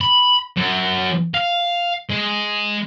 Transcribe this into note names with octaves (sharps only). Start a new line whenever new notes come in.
B5
F#2
F5
G#3